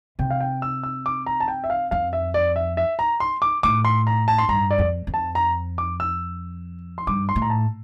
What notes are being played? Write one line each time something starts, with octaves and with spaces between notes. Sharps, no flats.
C3 G5
F5
G5
E6
E6
D6
A#5
A5
G5
E5
F5
F2 F5
E5
D5
E5
E5
A#5
C6
D6
A2 D6
C6
A#5
A5
C6
G2 A#5
D5
F2
F2
A5
A#5
D6
E6
C6
G2 D6
C6
A2
A#5
A5